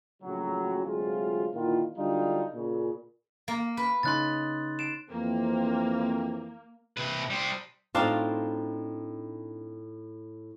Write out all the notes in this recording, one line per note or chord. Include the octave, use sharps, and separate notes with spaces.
A#1 A2 C#3 F#3
D2 C3 F#3 G#3 F4
A#2 D3 D#3 E4 F4
D3 F#3 G3 D4 D#4 F4
A#2 C#3
A#3
B4
C#3 D#4 C6 F#6 A6
C7 D7 E7
F2 E3 A#3 C4
C3 B4
G3 C5
A2 C4 D4 D#4 F4 F5